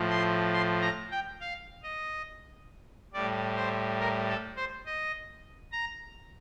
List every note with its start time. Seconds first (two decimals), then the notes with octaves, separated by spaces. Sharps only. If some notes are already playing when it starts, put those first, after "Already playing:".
Already playing: A2 F3
0.10 C6
0.53 C6
0.82 A#5
1.11 G5
1.40 F5
1.83 D#5
3.13 A2 G3 D5
3.56 C5
3.99 A#4
4.28 A4
4.56 C5
4.86 D#5
5.72 A#5